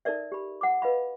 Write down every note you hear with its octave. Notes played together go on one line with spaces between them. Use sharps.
D#4 A4 A#4 D5 E5
G4 B5
F#5 D6
B4 D#5 F5 B5